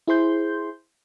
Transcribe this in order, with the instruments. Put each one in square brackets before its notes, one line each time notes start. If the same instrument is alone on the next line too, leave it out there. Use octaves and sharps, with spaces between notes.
[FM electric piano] E4 G#4 C5 C6 G6